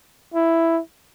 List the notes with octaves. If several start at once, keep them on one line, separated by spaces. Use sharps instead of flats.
E4